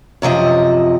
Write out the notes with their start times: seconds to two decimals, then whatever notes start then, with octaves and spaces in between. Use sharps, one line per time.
0.22 F#2 C3 F3 D#5